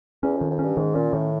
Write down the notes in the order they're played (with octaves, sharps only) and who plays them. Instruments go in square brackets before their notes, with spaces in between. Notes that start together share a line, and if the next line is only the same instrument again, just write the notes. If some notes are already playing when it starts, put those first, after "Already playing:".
[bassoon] E2 [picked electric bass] C#4
[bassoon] F2 [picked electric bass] D#3
[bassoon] F2
[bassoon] G2 [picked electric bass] C#4
[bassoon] G#2 [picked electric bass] D#3
[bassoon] A#2 [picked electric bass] C#4
[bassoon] A2 [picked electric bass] D#3